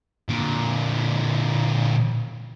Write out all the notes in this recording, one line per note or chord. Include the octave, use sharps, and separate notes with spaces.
A#2 D3